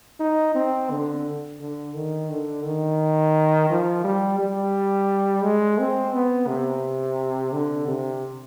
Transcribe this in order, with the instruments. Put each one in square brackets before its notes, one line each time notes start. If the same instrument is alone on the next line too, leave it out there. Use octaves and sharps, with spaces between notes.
[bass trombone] D#4
C4
D3
D3
D#3
D3
D#3
F3
G3
G3
G#3
C4
B3
C3
D3
C3